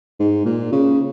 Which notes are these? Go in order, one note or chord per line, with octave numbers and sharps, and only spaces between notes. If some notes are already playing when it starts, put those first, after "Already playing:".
G#2
A#2
C#3